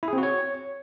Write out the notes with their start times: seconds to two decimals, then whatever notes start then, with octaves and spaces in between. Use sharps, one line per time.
0.03 E4
0.08 G#4
0.13 C4
0.18 F#4
0.23 C#5